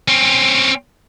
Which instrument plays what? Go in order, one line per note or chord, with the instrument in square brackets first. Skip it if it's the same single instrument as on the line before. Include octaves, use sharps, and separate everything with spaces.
[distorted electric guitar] C4 C#4